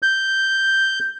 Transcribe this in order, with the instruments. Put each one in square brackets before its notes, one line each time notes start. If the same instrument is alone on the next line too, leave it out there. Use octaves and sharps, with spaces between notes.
[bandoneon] G6